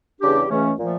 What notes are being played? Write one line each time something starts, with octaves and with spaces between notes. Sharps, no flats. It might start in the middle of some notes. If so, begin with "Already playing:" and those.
E2 C#3 G3 D4 G4
C#2 C#3 E3 A3 C#4
A#2 F3 A3